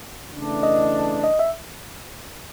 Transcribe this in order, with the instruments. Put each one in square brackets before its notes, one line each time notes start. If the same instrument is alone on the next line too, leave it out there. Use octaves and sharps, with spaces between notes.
[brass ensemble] C#3 E3 A3 D4
[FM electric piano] D#5
D#5
E5